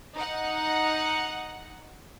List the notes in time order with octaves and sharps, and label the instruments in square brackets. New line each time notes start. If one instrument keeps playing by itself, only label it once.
[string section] D#4 F#5